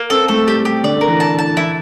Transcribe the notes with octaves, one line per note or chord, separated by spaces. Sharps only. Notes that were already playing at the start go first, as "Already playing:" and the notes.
Already playing: A#3
C4 A4
A3 A4
G3 G4
G3 G4
D3 D5
D3
A#4
E3
A5
A5
E3 E4